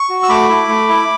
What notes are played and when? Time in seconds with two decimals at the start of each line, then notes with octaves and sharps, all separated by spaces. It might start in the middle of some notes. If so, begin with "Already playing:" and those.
Already playing: C#6
0.09 F#4
0.23 E6
0.29 A3 B5 D6
0.49 E4
0.68 A3
0.89 E4